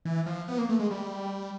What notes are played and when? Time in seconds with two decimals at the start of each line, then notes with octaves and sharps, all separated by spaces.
0.05 E3
0.26 F3
0.48 B3
0.58 A#3
0.69 A3
0.79 G#3
0.91 G3